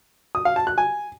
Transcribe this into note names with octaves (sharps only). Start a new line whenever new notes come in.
D#6
F5
A5
F#6
G#5